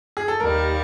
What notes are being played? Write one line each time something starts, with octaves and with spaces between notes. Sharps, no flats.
G#4
A4
D#2 D#3 G3 A#4